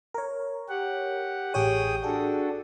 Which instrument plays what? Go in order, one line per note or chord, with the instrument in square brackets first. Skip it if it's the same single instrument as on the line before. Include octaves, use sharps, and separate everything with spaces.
[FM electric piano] A#4 C#5
[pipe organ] G4 F#5
[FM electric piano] A1 G4 C#5 [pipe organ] G#4 G5 D#6
[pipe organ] D4 F#4 A4 [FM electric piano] G#4